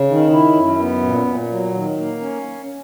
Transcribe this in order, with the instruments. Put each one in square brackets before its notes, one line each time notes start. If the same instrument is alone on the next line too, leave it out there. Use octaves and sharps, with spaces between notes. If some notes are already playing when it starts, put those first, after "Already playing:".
Already playing: [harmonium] C#3
D#3
E4
F#2
B3
A#2
A#2
F#3
D#3
A#3
C#4